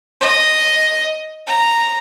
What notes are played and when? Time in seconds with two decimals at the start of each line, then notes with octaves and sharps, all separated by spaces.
0.21 D#5
1.47 A#5